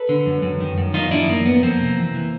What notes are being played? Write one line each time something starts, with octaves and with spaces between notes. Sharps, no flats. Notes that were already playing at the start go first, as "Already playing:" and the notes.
Already playing: A4 B4
D3
F#2
F#2
D#3
F#2
D#3 D#4 F4
F#2 D4 E4
F#2 A#3
F#2 B3
F2 A#3 C4
C3
E3
E3